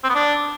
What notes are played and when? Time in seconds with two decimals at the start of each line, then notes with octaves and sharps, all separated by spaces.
0.04 C4
0.09 B3
0.15 D4